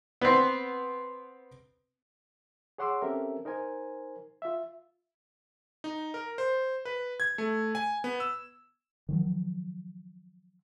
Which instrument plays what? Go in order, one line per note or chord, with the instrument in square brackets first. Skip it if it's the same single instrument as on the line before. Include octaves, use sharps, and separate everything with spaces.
[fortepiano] B3 C4
[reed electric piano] G#4 C#5 F#5 C6 D6 E6
C4 C#4 G4 A4 A#4 E5
D#4 A#4 C5 G#5
F4 E5
[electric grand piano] D#4
A#4
C5
B4
G#6
A3
G#5
B3
E6
[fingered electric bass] D#3 F3 F#3